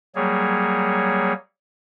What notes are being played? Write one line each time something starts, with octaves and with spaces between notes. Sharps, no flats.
F#3 G3 A#3 G#4 C#5